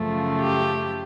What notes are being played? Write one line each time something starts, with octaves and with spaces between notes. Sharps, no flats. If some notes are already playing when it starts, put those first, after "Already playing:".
Already playing: F#2 C#3 F3 A3
G4